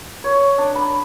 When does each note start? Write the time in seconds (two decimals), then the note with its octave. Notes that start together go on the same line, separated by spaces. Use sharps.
0.24 C#5
0.58 D4
0.75 B5